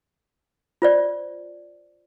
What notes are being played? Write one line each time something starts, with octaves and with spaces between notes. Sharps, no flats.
F4 C5 D5